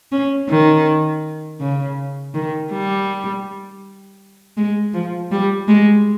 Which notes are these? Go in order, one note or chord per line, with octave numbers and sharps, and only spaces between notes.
C#4
D#3
C#3
D#3
G3
G#3
F3
G3
G#3